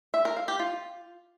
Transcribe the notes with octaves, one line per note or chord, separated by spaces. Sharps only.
E5
A#4
F5
G4
F4